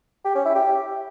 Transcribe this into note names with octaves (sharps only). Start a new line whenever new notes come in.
G4
C#4
E4
G4